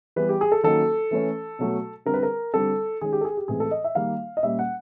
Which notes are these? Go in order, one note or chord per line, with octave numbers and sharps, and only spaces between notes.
E3 G3 B3 B4
G4
G#4
A4
D#3 F#3 A#3 C#4 A4
E3 A3 C#4
B2 F#3 A3
D3 G3 C4 A#4
B4
A#4
D3 G3 C4 A4
D#3 G#3 C#4 G#4
G4
A4
G#4
G4
A2 E3 G#3 C4 G#4
A4
D#5
E5
D#3 G3 A#3 F5
D#5
A#2 G3 A#3 C#4 E5
F#5